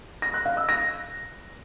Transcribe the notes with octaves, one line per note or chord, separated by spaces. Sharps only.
A#6
F#6
F5
E6
A#6